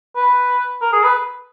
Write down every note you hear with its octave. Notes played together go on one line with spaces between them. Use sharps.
B4
A#4
G#4
B4